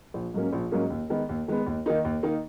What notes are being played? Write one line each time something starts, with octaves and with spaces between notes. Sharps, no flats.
A#1
G#2 F#3 A#3 C#4
A#1
G#2 F#3 A#3 C#4
D#2
D#3 G#3 B3
D#2
D#3 G#3 B3
D#2
D#3 A#3 D#4
D#2
D#3 A#3 D#4